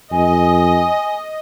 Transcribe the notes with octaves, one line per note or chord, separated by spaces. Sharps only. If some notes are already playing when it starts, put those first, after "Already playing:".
F2 D#5 G#5